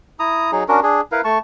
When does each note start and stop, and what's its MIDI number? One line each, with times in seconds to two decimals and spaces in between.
0.19 0.51 64
0.19 0.51 82
0.19 0.51 87
0.52 0.64 54
0.52 0.64 63
0.52 0.64 68
0.68 0.80 61
0.68 0.80 62
0.68 0.80 66
0.68 0.80 70
0.83 1.01 62
0.83 1.01 68
1.12 1.21 64
1.12 1.21 70
1.12 1.21 71
1.12 1.21 77
1.24 1.38 57
1.24 1.38 81
1.24 1.38 85